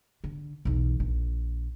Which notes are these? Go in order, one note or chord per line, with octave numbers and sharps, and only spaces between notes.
D3
B1 E2
A#1